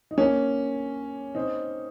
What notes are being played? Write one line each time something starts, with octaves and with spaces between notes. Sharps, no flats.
D#4
A#3 C#4
C4 D#4